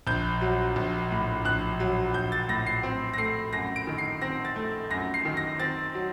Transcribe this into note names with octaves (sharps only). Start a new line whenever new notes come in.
A#1 G6
F#3
A#1
A2
A#1 F#6
F#3
A#1 G6
A6
A2 A#6
C7
C4
A#6
A3 C7
F#2 A#6
D7
D#3
C7
C4 A#6
A6
A3
F#2 A#6
C7
D#3
A#6
C4 A6
F#3